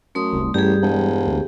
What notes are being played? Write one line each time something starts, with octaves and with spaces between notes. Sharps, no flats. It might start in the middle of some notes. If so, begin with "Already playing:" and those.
F#2 A3 C6 D#6
D#1 C2
A1 G2 G3 G4 G#4
E1
D2